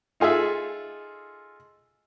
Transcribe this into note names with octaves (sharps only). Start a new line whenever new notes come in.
D#4 F4 G#4 A4 E5